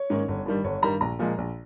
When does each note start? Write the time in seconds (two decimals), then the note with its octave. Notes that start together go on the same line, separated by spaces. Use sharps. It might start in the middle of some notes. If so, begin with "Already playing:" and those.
Already playing: C#5
0.10 G#2 D#3 A#3 C#4
0.28 G1
0.46 G2 D#3 G3
0.64 G1 C#5
0.82 G2 D#3 G3 A#5
1.01 A#1 A#5
1.19 A#2 F3 G#3
1.38 A#1